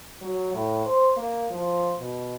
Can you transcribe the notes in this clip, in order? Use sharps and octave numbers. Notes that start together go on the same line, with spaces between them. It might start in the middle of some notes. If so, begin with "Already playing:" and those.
F#3
A2
C5
A#3
F3
B2